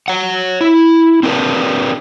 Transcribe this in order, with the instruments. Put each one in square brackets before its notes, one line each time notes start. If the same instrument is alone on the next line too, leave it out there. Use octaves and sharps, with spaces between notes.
[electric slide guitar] C#5 F#5
E4
C4 D4 G#4 A#4 B4